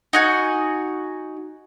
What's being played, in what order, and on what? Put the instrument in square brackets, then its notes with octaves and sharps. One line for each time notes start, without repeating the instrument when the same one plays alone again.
[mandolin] D#4 F#4 G#5